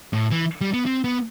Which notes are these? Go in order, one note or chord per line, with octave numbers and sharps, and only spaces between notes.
A2
E3
G3
B3
C4
B3